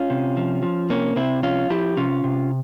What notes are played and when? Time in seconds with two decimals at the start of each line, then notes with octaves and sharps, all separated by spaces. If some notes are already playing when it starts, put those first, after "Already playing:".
Already playing: C#4 F4
0.10 C3
0.37 F3
0.63 F3
0.90 C3 A#3 C#4
1.16 C3 C4 E4
1.43 F3 C#4 F4
1.70 F3 E4 G4
1.97 C3 C#4 F4
2.24 C3